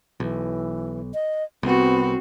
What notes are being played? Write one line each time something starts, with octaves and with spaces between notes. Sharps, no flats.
B1 E3
D#5
C2 B3 C4 F#4